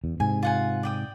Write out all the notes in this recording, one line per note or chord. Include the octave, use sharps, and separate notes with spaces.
E2
G#2 C3 G#5
F4 F#5 G#5
D5 G5 D#6